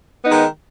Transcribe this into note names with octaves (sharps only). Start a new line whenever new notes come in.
D#3 G#3 B3 D#4